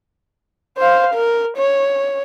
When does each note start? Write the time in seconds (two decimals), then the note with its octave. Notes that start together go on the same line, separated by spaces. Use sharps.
0.78 C5 F5
1.14 A#4
1.57 C#5